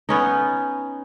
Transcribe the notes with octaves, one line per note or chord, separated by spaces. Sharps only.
B3 C#4 D#4